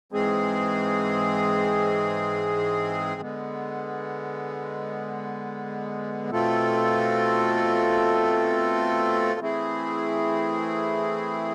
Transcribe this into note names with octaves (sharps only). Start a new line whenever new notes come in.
G#2 E3 G#3 C4 G#4
D3 G#3 B3
B2 A3 C4 F4 A4
E3 A3 C4 E4 G#4